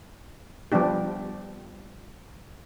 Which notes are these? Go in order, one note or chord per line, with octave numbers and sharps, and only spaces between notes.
F3 G3 B3 D4 G4